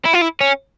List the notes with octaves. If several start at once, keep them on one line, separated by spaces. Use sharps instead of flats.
E4
F4
E4
C#4